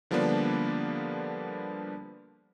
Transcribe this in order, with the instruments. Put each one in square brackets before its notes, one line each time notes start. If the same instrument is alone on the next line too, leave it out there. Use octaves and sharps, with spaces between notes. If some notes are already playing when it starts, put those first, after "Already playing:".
[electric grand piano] D3 F3 G3 A#3 B3 D4